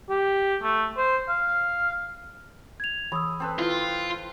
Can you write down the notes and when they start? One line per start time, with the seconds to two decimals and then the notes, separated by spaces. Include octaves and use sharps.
0.09 G4
0.63 A3
0.97 C5
1.29 F5
2.80 G#6 F7
3.12 E3 G#4 B5 D#6 E6
3.40 C4 A4 B4
3.59 E4 F4